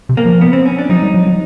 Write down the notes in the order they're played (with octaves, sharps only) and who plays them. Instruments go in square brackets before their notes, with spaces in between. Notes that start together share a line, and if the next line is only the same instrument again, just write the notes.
[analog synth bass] C3
[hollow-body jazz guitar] A#3
[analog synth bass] F3
[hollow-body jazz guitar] B3
C4
C#4
D4
[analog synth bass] F#3 [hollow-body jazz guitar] D#4
[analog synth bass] G3
F#3
F#3